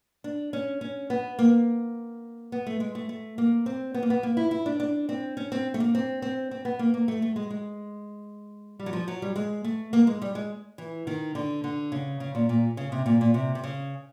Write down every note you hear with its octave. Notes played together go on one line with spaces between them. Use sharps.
D4
C#4
C#4
B3
A#3
B3
A3
G#3
A3
A3
A#3
C4
B3
A#3
B3
A#3
E4
E4
D4
D4
C4
C#4
C4
A3
A#3
C4
C4
C4
B3
A#3
A#3
A3
A3
G#3
G#3
G3
F#3
F3
F#3
G3
G#3
A3
A#3
G#3
G3
G#3
E3
D#3
D3
D3
C#3
C#3
A#2
A#2
C#3
C3
A#2
A#2
C3
C3
C#3